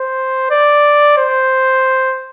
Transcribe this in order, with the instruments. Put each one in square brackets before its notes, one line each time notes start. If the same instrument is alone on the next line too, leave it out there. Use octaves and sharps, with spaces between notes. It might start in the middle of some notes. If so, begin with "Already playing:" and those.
Already playing: [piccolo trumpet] C5
D5
C5